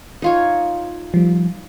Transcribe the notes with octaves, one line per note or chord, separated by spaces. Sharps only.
D#4 F4 C#5
F3 G3